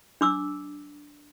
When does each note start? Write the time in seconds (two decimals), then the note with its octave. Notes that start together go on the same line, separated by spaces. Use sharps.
0.21 D4 D6 E6